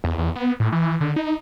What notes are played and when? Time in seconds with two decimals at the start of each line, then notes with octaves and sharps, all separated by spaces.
0.04 E2
0.18 E2
0.36 B3
0.60 A2
0.72 E3
1.00 D3
1.16 D#4